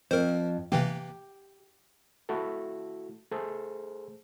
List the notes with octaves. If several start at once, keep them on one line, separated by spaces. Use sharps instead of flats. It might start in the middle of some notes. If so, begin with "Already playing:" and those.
F2 A#4 C5
C3 E3 A#3 G4
A3 E4 F#4 A4
A3 G#4 A4 C5